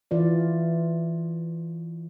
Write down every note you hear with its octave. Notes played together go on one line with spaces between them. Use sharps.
E3 F4 D5